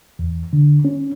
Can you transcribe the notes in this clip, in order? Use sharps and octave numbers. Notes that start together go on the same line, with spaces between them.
E2
D3
C#4